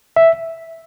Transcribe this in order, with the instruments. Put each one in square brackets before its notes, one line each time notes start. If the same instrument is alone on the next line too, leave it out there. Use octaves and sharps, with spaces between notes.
[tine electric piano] E5